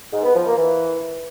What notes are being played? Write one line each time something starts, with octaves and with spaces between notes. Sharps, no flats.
G#2
B3
F3
A#3
E3